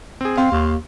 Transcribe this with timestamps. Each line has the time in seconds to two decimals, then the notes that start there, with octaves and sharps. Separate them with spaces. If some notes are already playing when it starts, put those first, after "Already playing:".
0.21 C4 G#4
0.37 C4 F5 C6
0.51 D#2